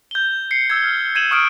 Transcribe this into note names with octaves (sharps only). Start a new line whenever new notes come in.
G6 G7
C7 C#7
E6 G#6
F6
G#6 D#7 E7 F#7
C#6 D#6 F6 D7